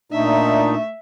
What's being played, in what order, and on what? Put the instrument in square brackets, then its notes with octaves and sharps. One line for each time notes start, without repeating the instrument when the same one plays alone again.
[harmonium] A#2 D#4 [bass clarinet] A3 [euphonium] D4 [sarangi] E5